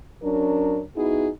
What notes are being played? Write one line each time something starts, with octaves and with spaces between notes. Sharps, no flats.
F#3 C#4 D4 A#4
B3 D#4 E4 F#4 G#4